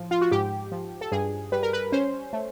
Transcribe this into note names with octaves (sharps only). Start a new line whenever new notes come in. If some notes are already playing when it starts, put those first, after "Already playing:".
Already playing: A2 F3
F4
F#4
G#2 G4
F3
A4
G2 G#4
G3 B4
A#4
B4
C#4 C5
A3